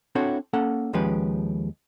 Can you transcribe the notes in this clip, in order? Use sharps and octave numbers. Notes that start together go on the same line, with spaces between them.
C4 D4 E4 F#4 A4 C#5
A#3 C#4 A4 F#5
D#2 F3 G#3 C#4 G4 B4